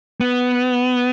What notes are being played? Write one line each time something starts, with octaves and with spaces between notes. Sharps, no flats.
B3